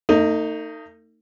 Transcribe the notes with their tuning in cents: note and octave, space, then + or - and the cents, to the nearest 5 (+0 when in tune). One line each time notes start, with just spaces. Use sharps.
A3 +45 D#4 +0